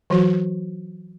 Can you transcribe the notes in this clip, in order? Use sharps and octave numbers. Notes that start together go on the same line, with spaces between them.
E3 F#3 F#4